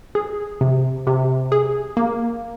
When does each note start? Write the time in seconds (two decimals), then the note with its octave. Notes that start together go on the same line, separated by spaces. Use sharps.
0.15 G#4
0.61 C3
1.07 C3
1.52 G#4
1.97 A#3